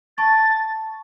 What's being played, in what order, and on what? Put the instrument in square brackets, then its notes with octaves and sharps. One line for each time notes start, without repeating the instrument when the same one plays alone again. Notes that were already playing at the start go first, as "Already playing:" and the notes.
[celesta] A5 C#6 [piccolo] A6